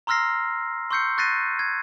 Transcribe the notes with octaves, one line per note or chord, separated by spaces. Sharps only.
A#5 C6 E6 F6 A#6 C7
C6 C#6 E6 G6 C7 C#7
C#6 F#6 A6 A#6 C7 D#7
G#6